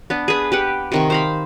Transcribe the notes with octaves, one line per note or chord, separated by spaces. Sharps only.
B3 D4
G#4 B4
G4 B4 F#5
C3 D#3 C#6
C5 F5 B5